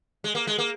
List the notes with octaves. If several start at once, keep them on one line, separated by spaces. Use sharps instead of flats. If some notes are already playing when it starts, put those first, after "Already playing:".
G#3
A#3
G#3
A#3